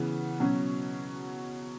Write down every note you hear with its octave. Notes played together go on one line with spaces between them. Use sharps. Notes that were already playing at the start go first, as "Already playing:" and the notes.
Already playing: C#3 E3 B3
B2 F#3 C#4